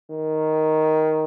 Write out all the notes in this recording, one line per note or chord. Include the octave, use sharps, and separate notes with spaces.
D#3